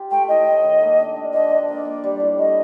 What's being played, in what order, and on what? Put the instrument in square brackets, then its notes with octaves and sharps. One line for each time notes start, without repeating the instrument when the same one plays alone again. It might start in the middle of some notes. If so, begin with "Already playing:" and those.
Already playing: [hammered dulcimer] F4 G4
[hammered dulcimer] A3 [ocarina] G5
[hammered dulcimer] A2 [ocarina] D#5
[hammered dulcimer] A2
D#3
A#3
D4
D4
[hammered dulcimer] F3 [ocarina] D#5
[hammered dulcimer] D4
[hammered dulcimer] A#3 [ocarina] D5
[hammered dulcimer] A#3
G3
A2
[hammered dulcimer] A3 [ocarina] D#5